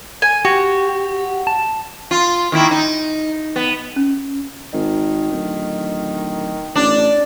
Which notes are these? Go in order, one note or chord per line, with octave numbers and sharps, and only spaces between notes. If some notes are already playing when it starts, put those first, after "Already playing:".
G#5
F#4 G4
A5
F4
D#3 A#3 E4
D#4
B3
C#4
G#1 D#3
D1
A1 D4